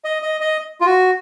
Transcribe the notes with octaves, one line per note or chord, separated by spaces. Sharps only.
D#5
D#5
D#5
F4
F#4